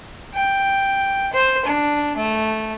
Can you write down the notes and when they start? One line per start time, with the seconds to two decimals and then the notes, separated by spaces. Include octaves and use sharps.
0.34 G5
1.33 C5
1.65 D4
2.16 A3